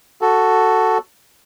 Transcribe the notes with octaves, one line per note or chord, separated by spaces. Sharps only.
F#4 A4